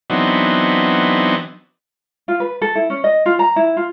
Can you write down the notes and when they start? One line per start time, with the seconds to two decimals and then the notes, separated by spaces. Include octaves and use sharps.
0.10 E3 F#3 B3 C4 D4 D#4
2.28 F4
2.40 B4
2.62 A4
2.75 E4
2.90 C#4
3.04 D#5
3.26 F4
3.39 A#5
3.56 E4
3.77 F4